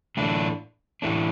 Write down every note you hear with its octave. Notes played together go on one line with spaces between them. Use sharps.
A2 E3 A3 D4
A2 E3 A3 D4